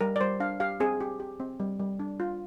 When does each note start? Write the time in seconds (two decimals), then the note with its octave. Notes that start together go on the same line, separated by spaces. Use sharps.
0.01 G3 A#4
0.16 D5
0.21 G3 C5
0.40 D4 F5
0.60 G4 F5
0.80 C4 G#4
1.01 G4
1.20 G4
1.40 C4
1.60 G3
1.79 G3
1.99 D4
2.20 F4